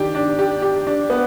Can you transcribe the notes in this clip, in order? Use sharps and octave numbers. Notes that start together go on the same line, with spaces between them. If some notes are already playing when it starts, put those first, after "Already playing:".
Already playing: D#3 D4 G4
D4
G4
G4
D4
B3